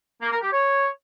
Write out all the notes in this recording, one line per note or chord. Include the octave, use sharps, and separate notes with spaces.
A#3
A#4
G4
C#5